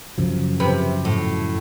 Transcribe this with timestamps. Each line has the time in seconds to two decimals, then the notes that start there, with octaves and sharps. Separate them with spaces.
0.18 F#2 C#3 F3
0.60 C3 B4
1.05 A2